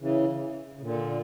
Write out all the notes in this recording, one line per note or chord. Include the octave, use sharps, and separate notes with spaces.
C#3 E3
C#3
A#2 D3